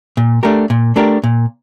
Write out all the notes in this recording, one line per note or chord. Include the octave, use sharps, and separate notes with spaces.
A#2
A3 D4 G4 A#4
A#2
A3 D4 G4 A#4
A#2